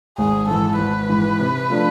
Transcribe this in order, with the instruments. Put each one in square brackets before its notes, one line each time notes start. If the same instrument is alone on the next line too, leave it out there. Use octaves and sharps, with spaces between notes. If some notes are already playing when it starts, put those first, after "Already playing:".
[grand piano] G#1 [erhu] G#4
[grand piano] G#2 E3 [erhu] A4
[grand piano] G#1 [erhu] B4
[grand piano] G#2 E3
C3
F3 A3 D4